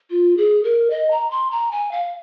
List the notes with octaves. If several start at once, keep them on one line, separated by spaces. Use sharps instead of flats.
F4
G#4
A#4
D#5
A#5
C6
A#5
G#5
F5